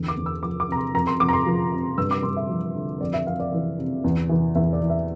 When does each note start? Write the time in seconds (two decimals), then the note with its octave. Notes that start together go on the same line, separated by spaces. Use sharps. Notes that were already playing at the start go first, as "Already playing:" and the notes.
Already playing: E2 D3
0.08 D6
0.17 E2
0.26 E6
0.43 F3 D6
0.60 D6
0.68 C3 A#5
0.77 C6
0.94 F2 A#5
1.07 C6
1.20 F2 D6
1.29 A#5
1.33 C6
1.46 F3
1.72 C3
1.98 G2 E6
2.11 D6
2.23 G2 C6
2.37 E5
2.49 F3
2.75 D3
3.01 F2 D5
3.14 E5
3.27 F2 F5
3.40 D5
3.53 E3
3.79 C3
4.04 E2
4.29 E3
4.55 E2 E5
4.73 D5
4.81 E3
4.90 E5